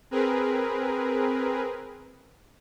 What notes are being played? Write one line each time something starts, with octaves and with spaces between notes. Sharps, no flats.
C4 G#4 A#4 B4